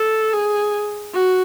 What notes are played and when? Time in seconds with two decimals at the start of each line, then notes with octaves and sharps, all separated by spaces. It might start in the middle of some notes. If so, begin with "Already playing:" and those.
Already playing: A4
0.33 G#4
1.14 F#4